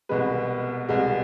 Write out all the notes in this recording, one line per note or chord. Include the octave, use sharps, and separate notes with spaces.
C2 B2 G#3 B4
C2 B2 G#3